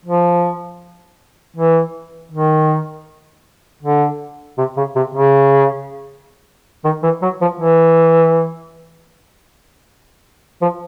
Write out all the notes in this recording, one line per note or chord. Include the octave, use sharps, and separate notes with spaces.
F3
E3
D#3
D3
C3
C#3
C3
C#3
D#3
E3
F#3
F3
E3
F3